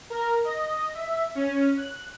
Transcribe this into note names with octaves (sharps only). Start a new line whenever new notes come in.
A#4
D#5
E5
C#4
F#6